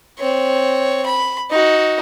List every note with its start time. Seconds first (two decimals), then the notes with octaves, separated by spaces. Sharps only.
0.19 C4 C#5
1.06 B5
1.50 D#4 F#4